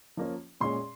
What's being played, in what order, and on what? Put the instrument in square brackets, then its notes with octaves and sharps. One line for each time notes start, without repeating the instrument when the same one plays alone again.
[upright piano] F3 A#3 C#4
A#2 G#3 C#4 C6